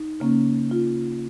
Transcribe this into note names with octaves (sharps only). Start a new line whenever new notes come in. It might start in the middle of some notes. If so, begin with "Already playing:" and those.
Already playing: D#4
C#3 A#3 C#4
F4